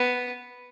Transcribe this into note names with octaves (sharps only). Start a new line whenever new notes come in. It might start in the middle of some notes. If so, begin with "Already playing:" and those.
Already playing: B3